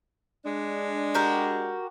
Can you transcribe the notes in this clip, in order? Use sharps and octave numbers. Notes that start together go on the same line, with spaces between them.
G#3 D4
F#4 G4 A#4